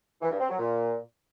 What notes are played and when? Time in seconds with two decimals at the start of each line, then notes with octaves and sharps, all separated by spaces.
0.21 E3
0.31 G2
0.40 C4
0.49 F#3
0.59 A#2